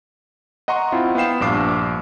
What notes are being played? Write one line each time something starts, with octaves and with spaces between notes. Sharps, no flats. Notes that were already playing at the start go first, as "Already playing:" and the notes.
D#5 F#5 A#5 C6 C#6
C4 E4 F4
B3 F5 G5 C7 E7
A#1 G2 D6 C7